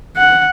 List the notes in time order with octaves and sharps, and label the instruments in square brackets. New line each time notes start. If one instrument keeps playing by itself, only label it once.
[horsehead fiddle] F#5